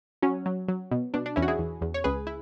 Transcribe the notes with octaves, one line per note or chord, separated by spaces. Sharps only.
F#3 C#4
F#3
F#3
B2
B2 D4
D4
E2 C#4 E4
F#4
E4 G#4
E2
E2
C#5
C#2 G#4 B4
E4